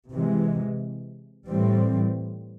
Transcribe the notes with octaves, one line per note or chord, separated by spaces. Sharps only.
C3 E3 G#3
A2 E3 G3 C4